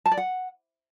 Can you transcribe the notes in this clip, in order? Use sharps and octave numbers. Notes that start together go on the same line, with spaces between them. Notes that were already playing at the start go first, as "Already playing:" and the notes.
A5
D5
F#5